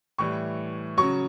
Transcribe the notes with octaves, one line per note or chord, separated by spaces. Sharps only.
A2 E3 G3 C#6
C#3 F#3 C#6